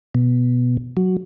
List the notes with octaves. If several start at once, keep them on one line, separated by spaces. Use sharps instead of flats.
B2
F#3